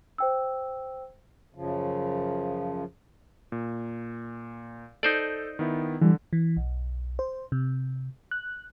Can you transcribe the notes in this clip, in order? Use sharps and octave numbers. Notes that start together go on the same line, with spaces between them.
C5 G5 E6
F#2 C#3 F3
A#2
D#4 A4 C5 D5
D#3 B3 E4
D3 E3 G3
E3
B1
C5
C3
F#6